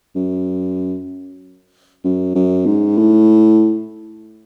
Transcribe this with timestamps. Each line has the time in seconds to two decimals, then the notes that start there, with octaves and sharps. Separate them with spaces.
0.15 F#2
2.04 F#2
2.35 F#2
2.66 G#2
2.98 A2